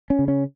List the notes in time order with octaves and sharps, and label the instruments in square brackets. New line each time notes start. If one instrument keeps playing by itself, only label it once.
[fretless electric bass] C#4
C#3
C#4